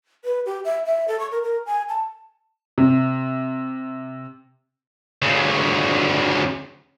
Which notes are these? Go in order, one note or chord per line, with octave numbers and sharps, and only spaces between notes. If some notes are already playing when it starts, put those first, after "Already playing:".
B4
G4
E5
E5
A4
C#6
A#4
A#4
G#5
A5
C3
D2 C#3